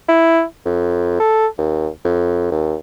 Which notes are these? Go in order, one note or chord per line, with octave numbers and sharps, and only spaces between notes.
E4
F2
A4
D#2
F2
D#2